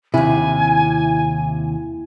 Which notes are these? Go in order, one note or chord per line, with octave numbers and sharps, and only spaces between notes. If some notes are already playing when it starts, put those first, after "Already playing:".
D#2 C3 E4 G#5